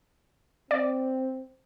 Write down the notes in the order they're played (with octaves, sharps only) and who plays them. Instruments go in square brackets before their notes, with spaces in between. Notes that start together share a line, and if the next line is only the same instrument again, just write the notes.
[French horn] C4 [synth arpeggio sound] D5